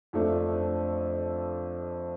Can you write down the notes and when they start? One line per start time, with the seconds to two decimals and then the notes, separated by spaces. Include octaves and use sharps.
0.13 F2 F3 A3 D4